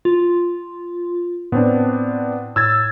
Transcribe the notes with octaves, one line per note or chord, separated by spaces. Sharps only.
F4
A2 B3 C4 D4
A2 E6 G#6 A6